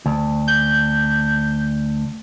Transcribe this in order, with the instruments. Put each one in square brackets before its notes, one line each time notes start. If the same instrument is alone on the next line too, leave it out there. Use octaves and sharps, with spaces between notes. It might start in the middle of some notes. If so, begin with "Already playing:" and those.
[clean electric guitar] D2
[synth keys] G6